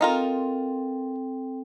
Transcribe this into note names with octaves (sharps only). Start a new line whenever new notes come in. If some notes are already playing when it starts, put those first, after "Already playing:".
C4 D#4 F4 A4 A#4 G5